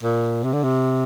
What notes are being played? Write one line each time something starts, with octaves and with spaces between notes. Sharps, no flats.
A#2
C3
D3
C3